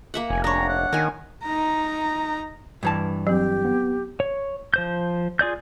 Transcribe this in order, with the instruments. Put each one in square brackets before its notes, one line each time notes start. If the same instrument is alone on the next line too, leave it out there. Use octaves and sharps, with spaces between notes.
[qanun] A#3 E5 F#5
[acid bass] F1 [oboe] G#5
[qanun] D4 C#5 [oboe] A#5
[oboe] F#5
[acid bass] D#3 [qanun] A#4 G#5
[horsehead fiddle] D#4 A#5
[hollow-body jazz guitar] G2 E3 A5
[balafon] F#3 C4 [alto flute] G4
[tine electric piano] B3
[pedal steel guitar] C#5
F3 C5 G6
F4 G#4 D5 G6